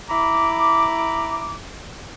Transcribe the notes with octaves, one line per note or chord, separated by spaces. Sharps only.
E4 A#5 B5 D6